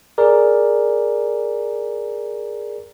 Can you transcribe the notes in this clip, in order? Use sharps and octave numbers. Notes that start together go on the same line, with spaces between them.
G#4 A#4 D5